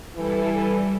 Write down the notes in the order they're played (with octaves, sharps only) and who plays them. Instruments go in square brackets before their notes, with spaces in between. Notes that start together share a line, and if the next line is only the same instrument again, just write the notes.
[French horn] E3 [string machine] G3 E4 A4